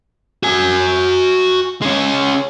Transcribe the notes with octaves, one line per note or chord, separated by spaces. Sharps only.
F#4 G#5
G#3 C#4